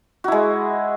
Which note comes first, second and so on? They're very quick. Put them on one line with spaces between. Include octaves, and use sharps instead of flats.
F#4 E4 G#3